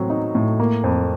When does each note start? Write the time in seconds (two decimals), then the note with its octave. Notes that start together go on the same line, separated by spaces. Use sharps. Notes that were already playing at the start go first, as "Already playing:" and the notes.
Already playing: A2 F#3 C4
0.10 D#4
0.35 A2
0.60 A#3
0.84 F2